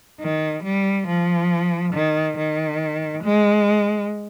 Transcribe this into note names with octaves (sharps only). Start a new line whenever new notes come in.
D#3
G3
F3
D#3
D#3
G#3